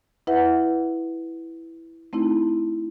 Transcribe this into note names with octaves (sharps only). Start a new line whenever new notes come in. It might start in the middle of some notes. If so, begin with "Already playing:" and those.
E4 B4 E5 F#5
A3 C4 D#4 E4